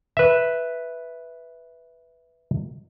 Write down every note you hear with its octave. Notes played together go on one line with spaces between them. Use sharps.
B4 E5